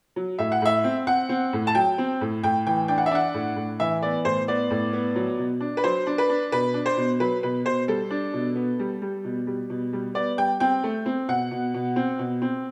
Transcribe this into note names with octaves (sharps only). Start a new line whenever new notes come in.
F#3
A2 E5
F#5
A2 E5
C4
C4 F#5
C4
A2
A5
F#3 G5
C4
A2
A2 G5
E3 G5
D4 G5
F#5
E5
D4 F#5
A2
A2
E3 E5
B3 D5
A2 C5
B3 D5
A2
B3
F#3
B2
D4
B4
F#3 C5
D4
B4
D4
B2 B4
D4
C5
B2
F#3 B4
B2 B4
B2 C5
G3 A4
D4
B2
B3
G3
G3
B2
G3
B2
G3
B3 D5
G3 G5
C4 G5
A3
C4
B2 F#5
B2
B2
C4
B2
C4